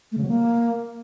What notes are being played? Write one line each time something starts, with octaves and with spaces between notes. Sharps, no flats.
A3
C#3
F#3
A#3